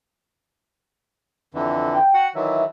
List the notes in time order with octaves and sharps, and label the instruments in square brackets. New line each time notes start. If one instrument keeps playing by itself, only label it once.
[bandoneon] F2 D3 E3
[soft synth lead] G5
[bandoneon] F#4 F#5
[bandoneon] D#3 E3 F#3 [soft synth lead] E5